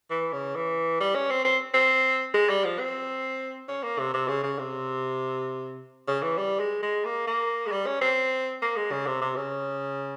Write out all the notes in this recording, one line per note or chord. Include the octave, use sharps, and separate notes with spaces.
E3
C#3
E3
G3
C#4
C4
C4
C4
G#3
G3
F3
C4
C#4
A#3
C3
C3
C#3
C#3
C3
C#3
E3
G3
G#3
G#3
A#3
A#3
G#3
G3
C#4
C4
A#3
G#3
C#3
C3
C3
C#3